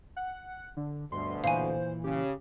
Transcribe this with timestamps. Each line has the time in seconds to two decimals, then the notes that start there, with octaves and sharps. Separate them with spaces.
0.16 F#5
0.77 D3
1.12 D2 G2 B2 C6
1.44 A#2 E3 C5 F5 G#5
2.04 C#3 G4